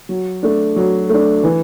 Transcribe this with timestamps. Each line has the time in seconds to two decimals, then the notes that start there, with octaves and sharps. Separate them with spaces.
0.09 F#3
0.43 A3 D4
0.76 F#3
1.09 A3 D4
1.43 E3